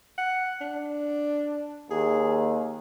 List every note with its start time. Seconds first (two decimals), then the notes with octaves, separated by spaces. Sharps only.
0.18 F#5
0.61 D4
1.91 D#2 G#4